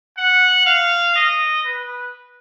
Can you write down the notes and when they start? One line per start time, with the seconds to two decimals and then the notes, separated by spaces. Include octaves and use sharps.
0.17 F#5
0.66 F5
1.16 D#5
1.66 B4